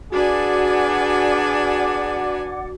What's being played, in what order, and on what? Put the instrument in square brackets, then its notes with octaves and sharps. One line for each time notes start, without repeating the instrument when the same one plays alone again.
[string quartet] D4 B4 G#5 [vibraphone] F#4 [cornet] G#4 [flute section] D5 F#5 D6